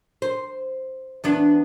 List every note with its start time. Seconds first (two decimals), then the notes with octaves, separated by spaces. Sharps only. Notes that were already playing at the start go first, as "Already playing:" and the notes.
0.22 C5
1.24 E2 B3 D4